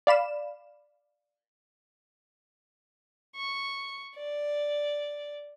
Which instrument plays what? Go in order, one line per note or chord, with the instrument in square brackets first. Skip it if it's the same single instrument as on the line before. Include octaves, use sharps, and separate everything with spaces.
[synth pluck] D5 F5 B5 E7
[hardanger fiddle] C#6
D5